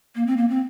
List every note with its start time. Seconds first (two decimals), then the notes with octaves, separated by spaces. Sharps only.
0.15 A#3
0.27 C4
0.37 A#3
0.49 C4